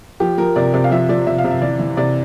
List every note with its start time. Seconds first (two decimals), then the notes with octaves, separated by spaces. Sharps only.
0.20 F3 G4
0.38 F3 A#4
0.56 C3 D5
0.73 C3 D5
0.84 F5
0.91 F3 E5
1.09 F3 D5
1.27 C3 E5
1.38 F5
1.44 C3
1.51 E5
1.62 E3 D5
1.79 E3
1.97 C3 D5